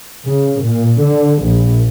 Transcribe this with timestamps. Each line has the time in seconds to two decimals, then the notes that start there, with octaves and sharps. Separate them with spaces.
0.25 C#3
0.62 A#2
1.01 D3
1.43 A#1